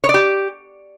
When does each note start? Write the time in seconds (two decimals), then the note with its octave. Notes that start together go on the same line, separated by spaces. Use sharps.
0.04 C#5
0.09 D5
0.14 G4